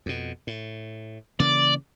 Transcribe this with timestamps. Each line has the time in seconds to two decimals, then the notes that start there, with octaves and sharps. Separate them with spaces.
0.06 F2 B2
0.47 A2
1.40 C#3 E3 A#3 D5